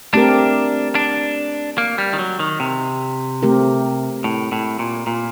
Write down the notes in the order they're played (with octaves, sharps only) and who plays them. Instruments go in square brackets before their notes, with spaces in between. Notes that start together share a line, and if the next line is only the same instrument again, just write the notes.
[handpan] A3 C4 G4 A#4 [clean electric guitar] D4
[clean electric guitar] D4
A#3
G3
D#3
F#3
D#3
C3
[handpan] A3 C4 G4 A#4
[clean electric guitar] A2
A2
A#2
A#2